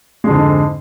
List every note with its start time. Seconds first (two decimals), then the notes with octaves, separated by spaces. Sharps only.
0.24 G#3
0.27 F2
0.30 D3
0.33 G#2